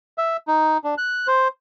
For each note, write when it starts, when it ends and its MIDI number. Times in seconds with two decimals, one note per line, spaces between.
0.18 0.37 76
0.48 0.78 63
0.84 0.95 62
0.98 1.27 90
1.27 1.48 72